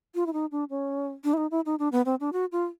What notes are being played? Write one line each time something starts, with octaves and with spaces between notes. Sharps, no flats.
F4
E4
D#4
D4
C#4
D4
E4
D#4
E4
D#4
D4
B3
C4
D4
F#4
F4